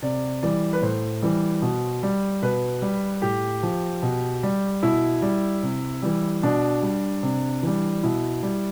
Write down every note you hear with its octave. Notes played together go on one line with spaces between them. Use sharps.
C3 D5
E3 G3 D5
B4
A2 C5
E3 G3
B2
G3
B2 B4
G3
A2 G4
F3
B2
G3
B2 E4
G3
C3
E3 G3
B2 D4
G3
C3
E3 G3
B2 E4
G3